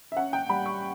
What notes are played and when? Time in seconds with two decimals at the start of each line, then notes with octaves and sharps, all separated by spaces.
0.12 E5
0.16 C#4 F#5
0.33 G5
0.50 G3 B5
0.66 C#6